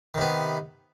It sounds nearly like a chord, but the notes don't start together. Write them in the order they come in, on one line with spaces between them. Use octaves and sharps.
D#3 C3 B3